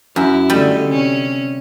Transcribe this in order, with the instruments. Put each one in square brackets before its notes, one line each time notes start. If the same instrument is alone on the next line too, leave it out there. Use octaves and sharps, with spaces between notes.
[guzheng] F#2 [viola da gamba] E4
[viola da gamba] D3 A3 D#5 [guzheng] G3
[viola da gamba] C3 C#4